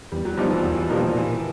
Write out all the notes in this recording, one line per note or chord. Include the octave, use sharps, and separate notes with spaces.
E2 G3
F#3
B2 F3 G3 A#3 D#4
E3
E2 D#3
E3
B2 F3 G3 A#3 D#4
D#3
A#2 E3